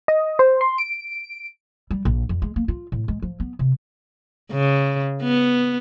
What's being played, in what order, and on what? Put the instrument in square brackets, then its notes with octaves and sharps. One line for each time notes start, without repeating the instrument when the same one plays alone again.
[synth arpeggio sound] D#5
C5
C6
D7
[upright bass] G3
A#1
F2
G#3
A#3
F4
A2
G#3
F3
B3
C3
[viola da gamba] C#3
B3